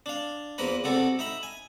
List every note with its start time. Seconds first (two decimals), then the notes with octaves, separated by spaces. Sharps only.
0.06 D4 F5
0.58 E2 F3 A#3 A#4 B4 B5
0.84 C3 G3 F#4 A4
1.19 D#4 E5 B5
1.43 G#5